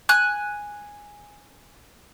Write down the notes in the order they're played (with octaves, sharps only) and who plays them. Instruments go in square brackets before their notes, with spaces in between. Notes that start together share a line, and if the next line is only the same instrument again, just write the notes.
[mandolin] G#5 F#6